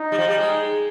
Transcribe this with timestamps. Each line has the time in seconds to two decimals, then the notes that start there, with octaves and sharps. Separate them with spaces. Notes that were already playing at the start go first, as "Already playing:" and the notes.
Already playing: D#4
0.12 G3
0.18 F3
0.28 G3
0.39 G#3